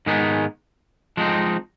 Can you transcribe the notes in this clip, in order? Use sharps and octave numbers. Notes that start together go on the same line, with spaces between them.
G#2 D#3 G#3 B3 D#4
F3 G#3 C4 D#4